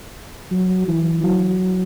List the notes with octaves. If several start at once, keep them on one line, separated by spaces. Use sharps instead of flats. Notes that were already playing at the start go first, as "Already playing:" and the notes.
F#3
E3
F#3